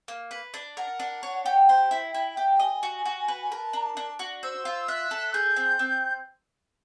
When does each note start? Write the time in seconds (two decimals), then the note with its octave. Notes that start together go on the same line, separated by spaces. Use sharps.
0.08 A#3
0.31 B4
0.54 D4
0.77 A#4 F#5
0.99 D4
1.23 C#5
1.46 G4
1.69 C5 G5
1.91 E4
2.14 E4
2.37 G4
2.60 D#5 G#5
2.83 F#4
3.06 F#4
3.28 B4
3.52 A#4 A5
3.73 D4 A#5
3.81 A5
3.97 D4
4.19 F#4
4.43 C5 E6
4.65 F4
4.88 E5 F#6
5.11 A4
5.33 G#4 G6
5.56 C4
5.79 C4